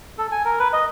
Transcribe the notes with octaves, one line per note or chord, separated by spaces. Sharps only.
A4
G#5
A#4
B4
D#5